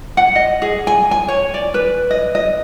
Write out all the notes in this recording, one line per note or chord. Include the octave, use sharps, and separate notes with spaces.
F#5
D#5
G#4
G#5
G#5
C#5
D5
B4
D#5
D#5